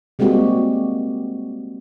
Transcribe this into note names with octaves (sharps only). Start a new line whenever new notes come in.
G3 G#3 A#3 C4 F#4 G4